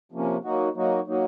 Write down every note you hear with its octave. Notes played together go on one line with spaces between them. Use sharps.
C3 F3 A#3 C#4
F#3 A#3 D#4 F#4
F#3 A#3 D#4 F#4
F#3 A#3 D#4 F#4